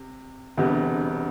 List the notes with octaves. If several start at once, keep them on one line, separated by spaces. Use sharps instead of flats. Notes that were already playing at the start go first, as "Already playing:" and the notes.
Already playing: C3
E1 D2 C3 G3 B3